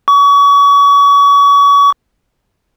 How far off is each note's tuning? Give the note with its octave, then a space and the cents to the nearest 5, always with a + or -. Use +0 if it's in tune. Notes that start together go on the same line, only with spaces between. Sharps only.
C#6 +35